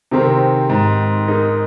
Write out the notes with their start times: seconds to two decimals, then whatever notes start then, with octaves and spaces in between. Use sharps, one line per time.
0.11 C3 D#3 G#3 C4 G4 A#4
0.70 G#2
1.28 G#3 D#4 A#4